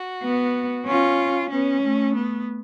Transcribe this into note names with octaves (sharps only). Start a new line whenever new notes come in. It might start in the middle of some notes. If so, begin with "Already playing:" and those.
Already playing: F#4
B3
C#4 F4
B3 C#4
A3
B3